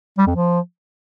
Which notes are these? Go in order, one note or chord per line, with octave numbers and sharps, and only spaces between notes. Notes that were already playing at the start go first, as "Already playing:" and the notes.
G3
F2
F3